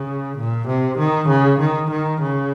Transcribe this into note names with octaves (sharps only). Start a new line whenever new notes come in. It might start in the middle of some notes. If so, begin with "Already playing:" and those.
Already playing: C#3
A#2
C3
D#3
C#3
D#3
D#3
C#3